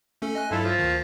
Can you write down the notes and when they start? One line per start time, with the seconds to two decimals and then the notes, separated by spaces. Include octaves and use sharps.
0.22 A3 C#4 A4
0.35 D#5 G#5 F#6
0.51 G2 F#3 E4 F4 A4
0.64 F3
0.79 D2 D#3